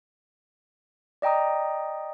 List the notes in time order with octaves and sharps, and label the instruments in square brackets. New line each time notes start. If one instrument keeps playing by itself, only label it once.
[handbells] D5 D#5 G5 A#5 D#6